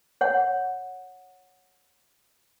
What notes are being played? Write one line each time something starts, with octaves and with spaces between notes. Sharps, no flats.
C#5 F#5